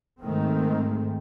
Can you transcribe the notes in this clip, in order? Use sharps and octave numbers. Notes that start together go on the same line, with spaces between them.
G#2 D#3 G#3 A3 C4